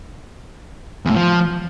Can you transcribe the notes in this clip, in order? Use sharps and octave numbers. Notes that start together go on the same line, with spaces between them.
E2
A2
F3